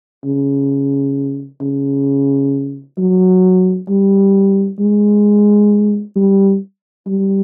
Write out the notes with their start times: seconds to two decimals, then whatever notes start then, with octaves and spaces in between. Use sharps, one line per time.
0.25 C#3
1.61 C#3
2.98 F#3
3.89 G3
4.79 G#3
6.16 G3
7.07 G3